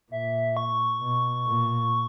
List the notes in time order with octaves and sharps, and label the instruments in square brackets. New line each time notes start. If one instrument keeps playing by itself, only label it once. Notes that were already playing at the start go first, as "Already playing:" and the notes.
[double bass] A#2 [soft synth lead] E5
[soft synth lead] C#6
[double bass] B2
A#2